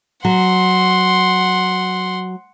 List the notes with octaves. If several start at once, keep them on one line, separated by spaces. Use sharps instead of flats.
F#3 F#5 C6